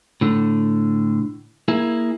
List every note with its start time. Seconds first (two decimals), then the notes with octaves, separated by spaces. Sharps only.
0.21 A2 D3
1.68 A#3 E4 G#4